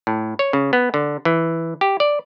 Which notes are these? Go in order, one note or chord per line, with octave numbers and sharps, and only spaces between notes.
A2
C#5
C#3
B3
D3
E3
G4
D5